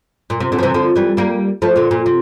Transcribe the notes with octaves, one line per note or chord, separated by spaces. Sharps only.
A#2
C3
A#2 D3
F3
C3 E3
D3 F3
E3 G3
G3 A#3
F3 A3
A#2 D3
A#2
C3